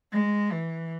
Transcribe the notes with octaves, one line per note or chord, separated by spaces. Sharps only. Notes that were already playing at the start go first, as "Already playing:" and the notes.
G#3
E3